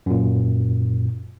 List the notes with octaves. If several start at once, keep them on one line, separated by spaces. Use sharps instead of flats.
F#2 A#2